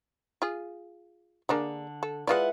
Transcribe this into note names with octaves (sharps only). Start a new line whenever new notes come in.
F4 G#4
D3 A#3 D4 G#4
A4
G#3 E4 F4 B4 D5 F#5